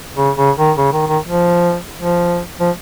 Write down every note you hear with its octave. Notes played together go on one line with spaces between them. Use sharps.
C#3
C#3
D#3
C#3
D#3
D#3
F3
F3
F3